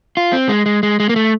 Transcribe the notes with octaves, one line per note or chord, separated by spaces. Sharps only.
F4
C4
G#3
G#3
G#3
G#3
A#3
A3